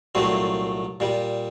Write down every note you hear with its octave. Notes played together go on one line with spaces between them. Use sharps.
C2 A#2 F#3 A3 C4
A#2 G3